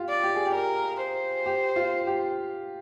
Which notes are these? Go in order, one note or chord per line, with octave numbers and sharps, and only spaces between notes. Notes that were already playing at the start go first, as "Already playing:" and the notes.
Already playing: F4 G4
D5
G4
G#4
G4
A#4
C5
G4
F4
G4